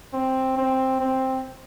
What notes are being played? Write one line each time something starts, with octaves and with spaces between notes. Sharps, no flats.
C4
C4
C4